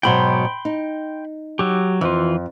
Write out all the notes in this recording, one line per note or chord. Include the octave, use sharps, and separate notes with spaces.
G#2 B2 F#3 G5 B5 C6
D#4
F#3 G4
F2 E3 F4